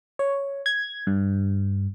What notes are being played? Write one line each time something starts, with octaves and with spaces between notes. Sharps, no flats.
C#5
G#6
G2